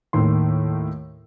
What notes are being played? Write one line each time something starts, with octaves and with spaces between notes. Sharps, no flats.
D#2 A2 D#3 C6